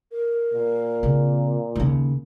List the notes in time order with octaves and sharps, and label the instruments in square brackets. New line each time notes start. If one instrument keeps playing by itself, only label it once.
[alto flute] A#4
[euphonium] A#2
[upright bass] C#3 C4
D#2 C#3